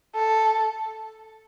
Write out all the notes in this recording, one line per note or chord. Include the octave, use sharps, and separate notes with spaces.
A4